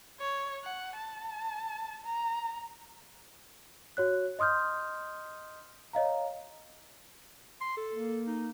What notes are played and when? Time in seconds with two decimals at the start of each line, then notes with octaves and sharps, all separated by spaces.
0.20 C#5
0.64 F#5
0.96 A5
2.04 A#5
3.97 F#4 C#5 F#6
4.39 D#5 C6 D#6 F6 G6
5.93 C#5 D#5 F5 A#5
7.61 C6
7.77 A4
7.94 A#3
8.27 D#4